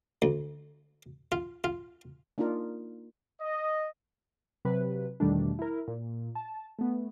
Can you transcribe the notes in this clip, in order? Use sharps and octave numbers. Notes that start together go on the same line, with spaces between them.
D2
F4
F4
A#3 D4 D#4 F4 A#4
D#5
C3 F#3 B4
E2 B2 D#3 G3 A3 D4
E4 A#4
A#2
A5
A3 B3